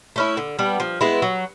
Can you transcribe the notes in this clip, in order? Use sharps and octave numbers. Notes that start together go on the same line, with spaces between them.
A3 C#4 E4
D3
G3 B3 D4
F3
G#3 B3 E4
F#3